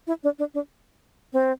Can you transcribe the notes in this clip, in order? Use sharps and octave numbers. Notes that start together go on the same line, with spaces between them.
E4
D4
D4
D4
C4